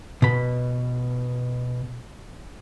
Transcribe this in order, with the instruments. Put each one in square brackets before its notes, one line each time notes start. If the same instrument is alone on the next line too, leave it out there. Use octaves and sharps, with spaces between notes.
[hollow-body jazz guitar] B2 B5